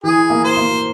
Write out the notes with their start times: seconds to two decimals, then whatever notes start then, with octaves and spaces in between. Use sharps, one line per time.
0.03 E3 G#4
0.30 A#3
0.44 C5
0.57 A#3